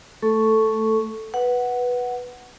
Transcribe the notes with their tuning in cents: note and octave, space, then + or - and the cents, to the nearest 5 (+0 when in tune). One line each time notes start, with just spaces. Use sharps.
A3 +0 A4 +0 C#6 +0
B4 -5 F#5 +0